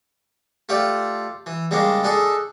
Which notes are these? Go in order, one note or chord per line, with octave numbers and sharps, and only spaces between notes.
A3 F4 G4 D5
E3
C#3 G3 G#3 A#3 D4
D4 D#4 G#4 A4